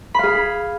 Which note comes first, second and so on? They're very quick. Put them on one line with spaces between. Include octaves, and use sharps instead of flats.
B5 F5 G#4